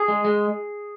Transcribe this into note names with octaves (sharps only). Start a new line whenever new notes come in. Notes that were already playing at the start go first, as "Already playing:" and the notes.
Already playing: G#4
G#3
G#3